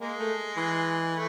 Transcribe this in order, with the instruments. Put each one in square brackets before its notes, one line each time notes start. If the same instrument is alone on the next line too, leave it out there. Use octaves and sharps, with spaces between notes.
[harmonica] G#3 [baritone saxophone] A#3
[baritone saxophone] A3
E3
[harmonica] A3